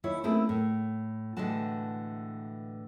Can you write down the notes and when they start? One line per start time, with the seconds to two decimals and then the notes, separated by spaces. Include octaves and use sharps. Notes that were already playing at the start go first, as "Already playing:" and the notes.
0.04 D#2 E4 C#5
0.24 A3 A#3 C4 C#4 E4 G#4
0.49 A2
1.37 A2 D3 E3 G#3 F#4 A5